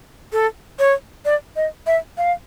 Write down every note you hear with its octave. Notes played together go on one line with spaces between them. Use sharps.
A4
C#5
D5
D#5
E5
F5